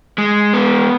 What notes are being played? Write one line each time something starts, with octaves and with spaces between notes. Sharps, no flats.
G#3
B3